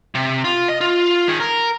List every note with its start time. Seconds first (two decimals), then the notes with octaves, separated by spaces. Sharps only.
0.15 C3
0.44 F4
0.68 D#5
0.81 F4
1.28 D#3 G#4
1.40 A#4